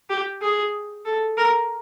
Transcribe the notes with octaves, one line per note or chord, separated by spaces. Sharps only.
G4
G#4
A4
A#4